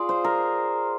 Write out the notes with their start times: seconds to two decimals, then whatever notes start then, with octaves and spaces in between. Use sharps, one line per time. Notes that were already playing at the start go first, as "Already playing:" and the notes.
Already playing: F4 G#4 D5
0.09 C5
0.24 A#4